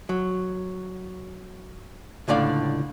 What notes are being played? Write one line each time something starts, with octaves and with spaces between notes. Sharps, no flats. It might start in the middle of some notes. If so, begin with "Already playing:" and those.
F#3
C#2 A2 D3 D5 F5